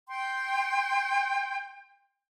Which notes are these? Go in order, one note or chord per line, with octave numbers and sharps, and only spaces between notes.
G5 C6